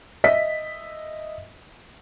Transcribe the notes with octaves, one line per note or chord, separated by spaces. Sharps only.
D#5 E5 B6